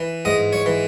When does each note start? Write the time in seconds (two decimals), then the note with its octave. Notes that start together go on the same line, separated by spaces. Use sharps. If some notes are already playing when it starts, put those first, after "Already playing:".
Already playing: E3
0.25 G#2 D#5
0.53 C#5
0.66 E3